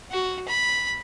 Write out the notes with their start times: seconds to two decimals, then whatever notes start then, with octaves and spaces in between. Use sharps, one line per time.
0.12 F#4
0.48 B5